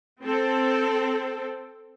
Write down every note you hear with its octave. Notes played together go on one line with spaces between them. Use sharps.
C4 A4